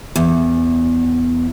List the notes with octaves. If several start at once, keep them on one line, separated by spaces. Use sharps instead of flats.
E2